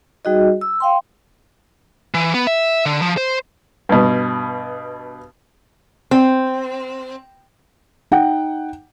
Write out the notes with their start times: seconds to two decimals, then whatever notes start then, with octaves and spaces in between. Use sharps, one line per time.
0.25 G3 D#4 F#4 G#4 D#5
0.61 E6
0.80 F5 G5 C6
2.14 E3
2.34 B3
2.47 E5
2.86 D3
3.02 F3
3.17 C5
3.89 G2 B2
6.11 C4
8.11 D#4 F#5 G5